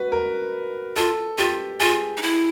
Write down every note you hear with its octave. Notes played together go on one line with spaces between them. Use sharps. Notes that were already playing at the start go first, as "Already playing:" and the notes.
Already playing: F#4 B4
A#4
F4 A4
F4 G4
F4 G#4
D#4
E4